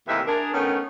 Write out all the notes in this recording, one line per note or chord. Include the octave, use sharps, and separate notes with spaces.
D#2 A2 C3 E3 D#4 E5
D4 G#4 A#4
D#3 A3 B3 C#4